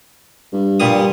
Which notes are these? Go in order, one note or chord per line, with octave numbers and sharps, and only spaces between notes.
G2
A#2 G3 D#6